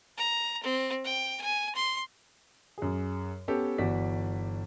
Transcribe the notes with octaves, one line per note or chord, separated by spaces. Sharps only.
A#5
C4
G5
G#5
C6
F#2 G#4
B3 C#4 G4 A4
G1 E3 F#4 D5 B6